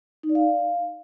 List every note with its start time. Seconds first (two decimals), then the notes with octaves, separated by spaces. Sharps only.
0.23 D#4
0.29 D5
0.35 F5